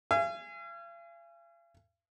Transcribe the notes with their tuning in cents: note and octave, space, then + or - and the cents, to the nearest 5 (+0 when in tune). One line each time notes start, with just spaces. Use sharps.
F5 -45 G#5 -10